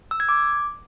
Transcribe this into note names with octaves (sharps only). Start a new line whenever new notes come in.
E6
G#6
D6